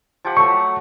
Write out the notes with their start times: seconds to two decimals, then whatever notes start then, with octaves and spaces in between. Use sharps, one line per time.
0.25 F3 G4 F#5
0.37 F#3 A3 C#6